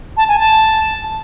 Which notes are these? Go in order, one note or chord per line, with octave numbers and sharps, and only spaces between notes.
A5
G#5
A5